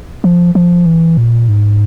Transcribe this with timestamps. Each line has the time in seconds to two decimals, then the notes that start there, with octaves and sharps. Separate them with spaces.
0.24 F3
0.55 F3
0.86 E3
1.17 A#2
1.49 G#2